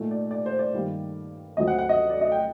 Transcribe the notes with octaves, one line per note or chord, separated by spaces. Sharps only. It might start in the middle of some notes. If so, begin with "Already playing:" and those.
Already playing: A#2 A3 D#4
D5
D5
C5
D5
G2 D#3 G3 A#3
D2 D3 F#3 C4 D#5
F#5
F#5
D#5
D5
D#5
G5